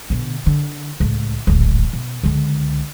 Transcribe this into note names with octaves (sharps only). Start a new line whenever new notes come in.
B2 D3
D3
C#2 A2
D1 G#1
B2
C#2 D3